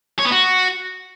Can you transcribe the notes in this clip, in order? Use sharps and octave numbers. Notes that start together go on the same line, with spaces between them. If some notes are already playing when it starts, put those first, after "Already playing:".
C#5
B3
F#4